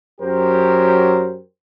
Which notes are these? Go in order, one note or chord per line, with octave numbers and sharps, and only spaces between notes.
F#2 F#3 G4 A#4 C5